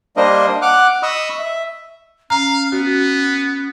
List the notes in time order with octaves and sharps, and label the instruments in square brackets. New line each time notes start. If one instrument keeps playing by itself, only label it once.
[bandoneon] G3 A#3 D4 A#4 C5 D#5
F#5 D6 F6 F#6
D#5 B5 C#6 D#6 E6
E5
[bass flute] C#4 [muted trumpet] F5 [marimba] A#5
[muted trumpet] B3 [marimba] F#4